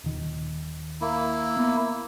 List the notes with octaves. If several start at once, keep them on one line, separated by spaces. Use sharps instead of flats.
D#1 D#3
A#3 E4
B3